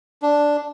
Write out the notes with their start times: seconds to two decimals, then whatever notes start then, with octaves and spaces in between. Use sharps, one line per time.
0.22 D4